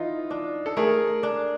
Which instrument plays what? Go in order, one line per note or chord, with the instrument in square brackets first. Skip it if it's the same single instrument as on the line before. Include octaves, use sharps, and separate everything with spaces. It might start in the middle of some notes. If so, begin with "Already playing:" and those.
Already playing: [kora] E3 [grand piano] D#4 F4
[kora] D4
[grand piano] A4
[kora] A3 [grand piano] G#4 A#4
[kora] D4